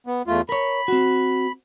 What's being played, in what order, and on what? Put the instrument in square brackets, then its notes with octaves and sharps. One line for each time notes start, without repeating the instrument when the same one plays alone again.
[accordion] B3
E2 A3 F4
[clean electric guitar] A#4 C#5 [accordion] B5
[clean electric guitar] C4 F#4